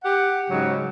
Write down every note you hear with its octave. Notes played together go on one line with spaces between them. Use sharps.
G4 F#5
G#2 C#3 F#3